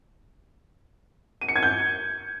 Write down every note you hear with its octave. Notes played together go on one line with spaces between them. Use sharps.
D#7
C#7
G#6
G6